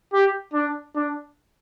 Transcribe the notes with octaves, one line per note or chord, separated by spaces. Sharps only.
G4
D4
D4